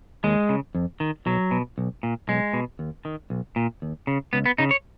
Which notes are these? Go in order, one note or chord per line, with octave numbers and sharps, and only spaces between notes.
D#2 G#3
C#3
F2
D#3
B1 F#3
B2
B1
A#2
B1 G#3
B2
D#2
D#3
B1
A#2
D#2
C#3
C#2 B3
B3
C#3 D#4
C#5